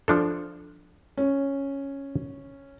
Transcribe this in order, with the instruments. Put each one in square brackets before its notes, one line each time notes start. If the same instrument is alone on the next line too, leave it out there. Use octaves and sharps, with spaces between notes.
[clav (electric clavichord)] F3 D4 A4
[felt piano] C#4